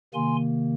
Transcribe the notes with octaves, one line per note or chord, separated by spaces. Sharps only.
C3 D#3 A#3 G#5 C6